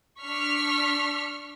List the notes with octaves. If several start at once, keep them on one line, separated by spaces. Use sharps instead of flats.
D4 C#6 F6 B6